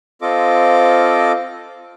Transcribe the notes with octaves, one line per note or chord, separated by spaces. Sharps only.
C4 F4 A4 D#5 D6